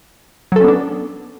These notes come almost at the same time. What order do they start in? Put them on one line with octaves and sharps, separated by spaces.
F#3 A4 C#4 B3 D4